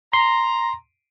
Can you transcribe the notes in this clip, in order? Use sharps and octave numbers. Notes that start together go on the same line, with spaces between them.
A#5 C6